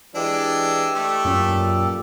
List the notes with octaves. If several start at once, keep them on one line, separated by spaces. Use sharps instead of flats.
E3 G#3 D4 G4 A4
A3
F#2 A#2